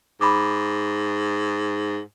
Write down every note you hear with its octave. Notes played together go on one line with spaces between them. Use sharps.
G#2 B5 D6